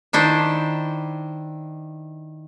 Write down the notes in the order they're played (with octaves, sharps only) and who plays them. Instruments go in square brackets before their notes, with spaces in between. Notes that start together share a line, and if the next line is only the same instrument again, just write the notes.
[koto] D#3 D4 E4 C5